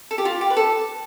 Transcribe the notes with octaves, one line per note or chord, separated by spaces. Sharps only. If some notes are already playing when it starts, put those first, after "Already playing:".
A4
G4
F4
G4
B4
A4